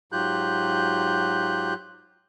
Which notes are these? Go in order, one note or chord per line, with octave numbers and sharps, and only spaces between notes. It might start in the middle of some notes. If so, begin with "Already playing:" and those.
G#2 F#3 F4 G4 F#6 G6